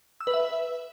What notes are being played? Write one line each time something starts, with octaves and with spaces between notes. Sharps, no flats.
E6
B4
E5